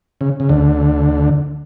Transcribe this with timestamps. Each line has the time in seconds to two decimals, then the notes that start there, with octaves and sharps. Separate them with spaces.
0.21 C#3
0.40 C#3
0.49 D2 D3